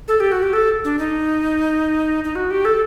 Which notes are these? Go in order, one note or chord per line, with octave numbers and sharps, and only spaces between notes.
A4
G4
F#4
G4
A4
D4
D#4
D#4
F#4
G4
A4